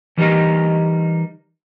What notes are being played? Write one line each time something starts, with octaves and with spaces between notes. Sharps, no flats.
E3 G3 D#4 G4 A#4 D#5